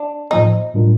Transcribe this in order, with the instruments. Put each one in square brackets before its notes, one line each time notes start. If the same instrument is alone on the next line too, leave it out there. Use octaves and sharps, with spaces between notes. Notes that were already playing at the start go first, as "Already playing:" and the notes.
Already playing: [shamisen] D4
[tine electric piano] A2 F3 A#3 F4 C5 [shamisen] D#4
[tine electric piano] A2 G3 D4 F4 A#4